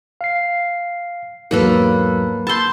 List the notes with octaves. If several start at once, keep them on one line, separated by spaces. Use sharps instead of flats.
F5 C7
E2 G#2 F#3 A#3 A4 B4
A5 B5 C6 E6 G6